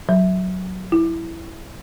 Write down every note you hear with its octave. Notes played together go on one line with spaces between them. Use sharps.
F#3
E4